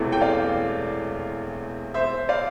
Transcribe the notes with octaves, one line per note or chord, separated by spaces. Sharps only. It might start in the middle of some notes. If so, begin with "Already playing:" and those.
Already playing: E1 E2 C3 E3 A3
G5
D5 F5
C5 E5
D5 F5